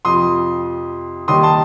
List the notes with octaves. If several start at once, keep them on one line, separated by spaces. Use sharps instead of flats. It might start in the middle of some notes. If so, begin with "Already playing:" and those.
F2 C3 F3 C6 D#6
D#2 D#3 G3 C6 D#6
A5 C6